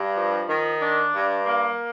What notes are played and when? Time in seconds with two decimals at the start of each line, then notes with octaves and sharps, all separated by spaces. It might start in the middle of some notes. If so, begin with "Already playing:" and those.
Already playing: G2
0.16 F3
0.49 D#3
0.81 D4
1.14 G2
1.46 A#3